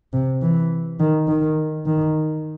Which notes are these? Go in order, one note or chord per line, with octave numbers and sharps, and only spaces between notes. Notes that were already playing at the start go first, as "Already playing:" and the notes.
C3
E3
D#3
D#3
D#3